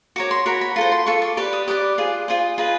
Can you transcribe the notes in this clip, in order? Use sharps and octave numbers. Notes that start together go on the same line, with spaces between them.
F#4 A#4 C#5 D6
C6
F#4 A#4 C#5 B5
B5
F4 A4 C5 C6
C6
F4 A4 C#6
D6
G4 B4 D5 D6
D#6
G4 B4 D5 D6
F4 G#4 C5
F4 G#4 C5
F4 G#4 B4 D#5